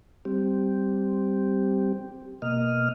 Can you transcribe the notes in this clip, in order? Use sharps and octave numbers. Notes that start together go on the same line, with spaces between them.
G3 C4 G4
B2 A#3 D#5 F6